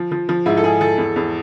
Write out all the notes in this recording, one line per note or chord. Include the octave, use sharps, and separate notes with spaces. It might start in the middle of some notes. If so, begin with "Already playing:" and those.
Already playing: F3
F3
F3
G#2 E4
A4
G#2 G#4
F3 A4
E2
E2